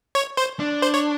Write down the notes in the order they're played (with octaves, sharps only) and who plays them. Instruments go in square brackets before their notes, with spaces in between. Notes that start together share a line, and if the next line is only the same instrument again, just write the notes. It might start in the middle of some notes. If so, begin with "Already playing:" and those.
[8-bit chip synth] C#5
C5
[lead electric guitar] D4
[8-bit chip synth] C5
C#5